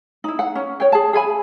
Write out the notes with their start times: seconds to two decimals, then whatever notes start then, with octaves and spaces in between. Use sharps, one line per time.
0.24 D#4 E4
0.39 F#5
0.55 C#4
0.80 C#5 G5
0.92 G#4 A5
1.13 G#4 E5 G#5 B5